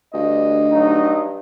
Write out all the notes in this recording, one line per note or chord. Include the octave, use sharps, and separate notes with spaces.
D2 G2 D#5
G2 F#3 D#4